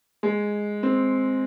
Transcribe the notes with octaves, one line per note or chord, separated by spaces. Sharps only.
G#3
C4